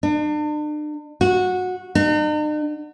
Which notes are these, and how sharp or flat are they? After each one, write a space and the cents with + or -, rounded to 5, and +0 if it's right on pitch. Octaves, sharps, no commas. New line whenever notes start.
D4 +40
F#4 -15
D#4 -45